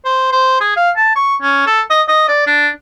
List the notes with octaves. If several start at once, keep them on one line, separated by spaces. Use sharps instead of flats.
C5
C5
G#4
F5
A5
C#6
C#4
A4
D#5
D#5
D5
D4